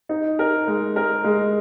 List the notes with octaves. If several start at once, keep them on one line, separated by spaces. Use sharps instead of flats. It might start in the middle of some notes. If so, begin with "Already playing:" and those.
D#4
A#4
G#3
A#4
G#3